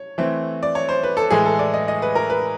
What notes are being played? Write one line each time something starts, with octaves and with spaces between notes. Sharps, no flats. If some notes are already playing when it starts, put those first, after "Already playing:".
Already playing: C#5
E3 A3 C4
D5
C#5
C5
B4
A4
A2 E3 G#3 G#4
A4
D5
D#5
D#5
B4
A#4
B4